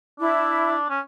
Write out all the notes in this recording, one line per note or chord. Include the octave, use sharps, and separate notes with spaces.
D4 E4
C#4